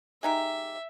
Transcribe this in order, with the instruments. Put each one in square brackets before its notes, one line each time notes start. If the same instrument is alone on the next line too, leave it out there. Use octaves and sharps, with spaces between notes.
[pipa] G#3 D#4 G4 [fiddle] E5